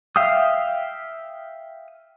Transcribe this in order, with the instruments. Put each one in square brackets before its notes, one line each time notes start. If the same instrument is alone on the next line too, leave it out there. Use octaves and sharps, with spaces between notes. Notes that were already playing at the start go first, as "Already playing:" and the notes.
[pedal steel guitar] E5 F5 G5 D#6